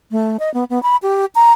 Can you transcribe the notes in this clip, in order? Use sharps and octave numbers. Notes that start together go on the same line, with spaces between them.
A3
D#5
B3
B3
B5
G4
A#5